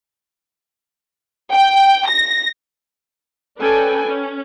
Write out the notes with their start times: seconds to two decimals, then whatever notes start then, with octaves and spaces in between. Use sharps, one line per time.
1.52 G5
2.08 A#6
3.60 C#4 A4 B4 D5 G5 G#5
4.06 C#4